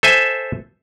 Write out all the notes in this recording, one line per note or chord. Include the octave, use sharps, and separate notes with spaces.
A4 C5 E5 G#5